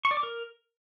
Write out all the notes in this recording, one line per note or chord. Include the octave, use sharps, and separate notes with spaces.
C#6
D5
D6
A#4